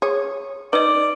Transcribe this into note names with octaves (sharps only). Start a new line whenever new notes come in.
G#4 C#5
D#4 B4 D5 D#5